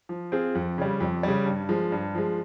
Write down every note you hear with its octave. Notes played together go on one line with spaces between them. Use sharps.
F3
C4 F4 G#4
F2
C#3 G3
F2
C#3 G3
G2
F3 G#3
G2
F3 G#3